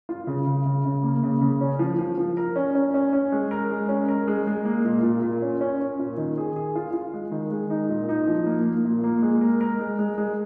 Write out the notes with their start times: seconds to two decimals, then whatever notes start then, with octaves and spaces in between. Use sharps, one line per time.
0.09 F4
0.27 C#3
0.47 C#3
0.66 C#3
0.85 C#3
1.03 A#3
1.23 C#3
1.41 C#3
1.61 C#4
1.79 F3
1.99 F3
2.18 F3
2.37 A#4
2.56 C#4
2.75 C#4
2.94 C#4
3.13 C#4
3.32 G#3
3.51 A#4
3.70 G#3
3.89 C#4
4.08 A#4
4.27 G#3
4.47 G#3
4.65 A#3
4.85 A#2
5.03 A#2
5.22 A#2
5.42 C#4
5.61 C#4
5.80 C#4
5.99 A#2
6.17 D#3
6.37 G#4
6.56 G#4
6.75 F4
6.93 F4
7.14 G#3
7.32 D#3
7.51 G#3
7.70 D#4
7.89 A#2
8.09 D#4
8.27 F3
8.46 A#3
8.65 A#3
8.85 A#2
9.04 A#3
9.22 G#3
9.41 A#4
9.61 A#4
9.79 G#3
9.99 G#3
10.18 G#3